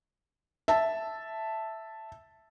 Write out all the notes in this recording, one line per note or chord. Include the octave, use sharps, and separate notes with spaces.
E5 A5